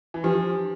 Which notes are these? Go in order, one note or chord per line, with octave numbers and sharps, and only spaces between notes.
E3
F3 D4 G4 B4